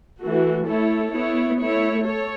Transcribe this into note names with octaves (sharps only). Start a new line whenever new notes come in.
E3 A3 F#4
A3 E4 A4 C#5
B3 E4 C#5
A3 E4 C#5
A4 C#5